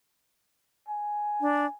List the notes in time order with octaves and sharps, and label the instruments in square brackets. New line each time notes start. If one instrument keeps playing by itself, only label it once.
[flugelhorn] G#5
[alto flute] D4